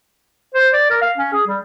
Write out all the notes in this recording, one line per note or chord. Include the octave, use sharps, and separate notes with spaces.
C5
D5
A#4
F5
C#4
G#4
G3